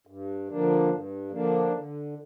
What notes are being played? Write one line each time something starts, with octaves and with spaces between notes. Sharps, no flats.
G2
D3 F3 A#3 D4
G2
D3 F3 A#3 D4
D3